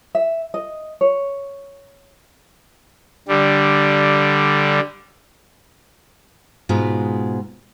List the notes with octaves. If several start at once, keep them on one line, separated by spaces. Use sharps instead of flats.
E5
D#5
C#5
D3 G3
G#2 B2 G#3 F4